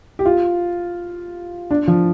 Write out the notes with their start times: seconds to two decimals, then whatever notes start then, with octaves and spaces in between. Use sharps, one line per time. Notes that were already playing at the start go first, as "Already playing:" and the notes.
0.19 G4
0.25 F4
1.71 D4
1.88 F3